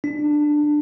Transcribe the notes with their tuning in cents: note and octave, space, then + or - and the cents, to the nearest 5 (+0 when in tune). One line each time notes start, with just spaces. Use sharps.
D4 +15